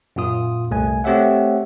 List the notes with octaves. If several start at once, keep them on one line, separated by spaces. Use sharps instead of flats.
F#2 A#2 F4 D#6
C2 A3 G#5
A3 C4 G4 C#5 E5 F#5